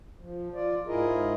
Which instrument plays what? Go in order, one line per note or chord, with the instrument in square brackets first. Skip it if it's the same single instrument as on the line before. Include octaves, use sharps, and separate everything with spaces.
[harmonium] F3
F4 D5
G#2 E4 F4 G#4 A#4 D#5